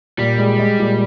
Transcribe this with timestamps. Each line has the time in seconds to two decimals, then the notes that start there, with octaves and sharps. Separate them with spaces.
0.18 A#2 G3
0.38 G#3
0.59 G#3
0.79 A#2